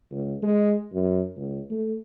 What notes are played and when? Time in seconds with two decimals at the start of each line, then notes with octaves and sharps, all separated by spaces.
0.11 C#2
0.43 G#3
0.93 F#2
1.36 C#2
1.70 A3